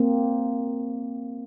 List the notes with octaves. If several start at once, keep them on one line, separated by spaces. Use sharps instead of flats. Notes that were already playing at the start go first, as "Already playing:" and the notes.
Already playing: A#3 C4